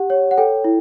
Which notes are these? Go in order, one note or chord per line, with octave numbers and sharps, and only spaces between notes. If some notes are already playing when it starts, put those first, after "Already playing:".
Already playing: G4 F#5
C#5
F#5
A4 G5
E4